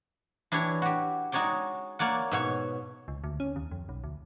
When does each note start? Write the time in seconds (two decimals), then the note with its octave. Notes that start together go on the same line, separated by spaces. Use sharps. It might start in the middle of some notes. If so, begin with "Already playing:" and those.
0.52 E3 D4 E4 G4 C#5
0.82 F#4 G4
1.32 G#3 D#4 F#4 C#5 D5 G5
1.99 A#3 C#5 D5 F#5
2.31 G#2 B2 C#5
3.08 C#2
3.24 D2
3.40 C#4
3.56 D#2
3.71 F2
3.89 B1
4.04 D2